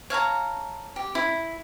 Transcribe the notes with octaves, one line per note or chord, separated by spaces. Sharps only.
C#5 F5 A5 A#5
G4
E4